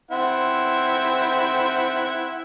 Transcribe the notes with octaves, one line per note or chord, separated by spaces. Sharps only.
C4 E4 F#5